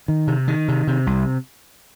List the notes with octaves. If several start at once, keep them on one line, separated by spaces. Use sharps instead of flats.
D#3
C3
D#3
C3
C3
C2